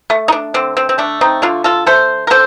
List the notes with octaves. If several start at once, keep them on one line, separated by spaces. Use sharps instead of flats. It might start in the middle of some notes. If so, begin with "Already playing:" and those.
A3
D#4
D4
D3 C4
C4
C4
A3 D4
C4 D#4
D3 D4 F4
F4 A4
A3 A4 C5
A#4
D3 A4 C5